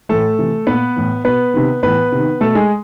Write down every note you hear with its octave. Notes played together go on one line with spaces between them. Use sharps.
A2 E3 A3 A4
C3 E3
A#2 B3 B4
A2 E3
B2 B3 B4
C3 D#3
A2 E3 B3 B4
C3 D#3
B2 A3 A4
G#3 G#4